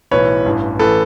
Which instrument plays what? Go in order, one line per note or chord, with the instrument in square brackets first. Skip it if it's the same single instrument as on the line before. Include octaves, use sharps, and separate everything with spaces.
[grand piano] B1 A2 E3 B4 C#5
A1 G2 E3
A1 A2 E3 A4 B4